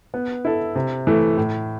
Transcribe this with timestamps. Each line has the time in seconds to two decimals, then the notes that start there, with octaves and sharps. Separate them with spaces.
0.14 B3
0.45 E4 A4
0.76 C3
1.07 E3 A3
1.37 A2